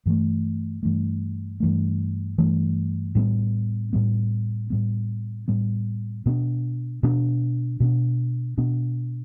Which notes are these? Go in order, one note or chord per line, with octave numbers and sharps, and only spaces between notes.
G2 E3 A3
G2 E3 A3
G2 E3 A3
G2 E3 A3
A2 G3 B3
A2 G3 B3
A2 G3 B3
A2 G3 B3
B2 B3 D4
B2 B3 D4
B2 B3 D4
B2 B3 D4